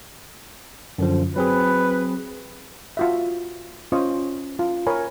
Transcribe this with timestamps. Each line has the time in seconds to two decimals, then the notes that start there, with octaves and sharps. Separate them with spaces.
0.98 F#2 D3 F3
1.36 F#3 C4 G#4 B4
2.97 F4 F#4 E5
3.92 C#4 F4 C5 D#5 C#6 D#6
4.59 F4
4.87 A#4 C#5 G#5 B5